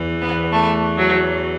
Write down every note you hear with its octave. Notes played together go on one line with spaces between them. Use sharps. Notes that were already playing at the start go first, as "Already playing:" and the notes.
Already playing: E2 E3
B3
A3
F#3